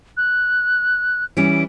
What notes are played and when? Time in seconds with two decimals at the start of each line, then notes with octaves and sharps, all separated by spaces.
0.16 F#6
1.37 E3 G3 C#4 D7